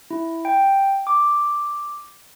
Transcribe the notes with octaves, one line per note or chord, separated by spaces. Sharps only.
E4
G5
D6